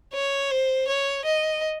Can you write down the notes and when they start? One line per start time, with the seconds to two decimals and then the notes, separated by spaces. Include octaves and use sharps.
0.13 C#5
0.51 C5
0.87 C#5
1.25 D#5